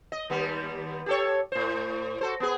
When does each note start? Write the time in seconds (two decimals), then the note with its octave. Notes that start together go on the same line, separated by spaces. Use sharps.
0.12 D#5
0.30 D#2 G3 B3
1.06 G4 A4 C#5
1.52 A2 C5
2.21 F#4 A4 C5
2.40 B3 G#4